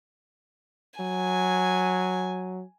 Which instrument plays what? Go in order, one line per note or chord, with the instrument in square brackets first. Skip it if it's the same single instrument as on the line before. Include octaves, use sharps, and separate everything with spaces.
[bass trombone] F#3 [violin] G#5